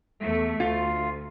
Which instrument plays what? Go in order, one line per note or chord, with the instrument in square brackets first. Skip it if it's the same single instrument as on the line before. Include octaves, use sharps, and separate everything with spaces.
[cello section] E2 A3
[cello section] D2 [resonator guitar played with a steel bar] F4